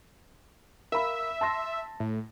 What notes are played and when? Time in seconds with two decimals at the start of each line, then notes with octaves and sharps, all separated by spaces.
0.92 A#4 E5 F5 B5
1.41 A5 C6 A#6
2.00 A2